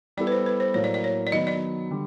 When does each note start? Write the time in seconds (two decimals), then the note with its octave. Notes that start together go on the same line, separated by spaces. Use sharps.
0.17 G3 B3 E4 A4 D5
0.27 B4
0.32 C5
0.46 B4
0.60 C5
0.74 A2 F#3 A#3 C#5
0.84 D5
0.94 D5
1.04 C#5
1.27 D5
1.32 D#3 F#3 B3 D#5
1.47 D5
1.91 D3 G3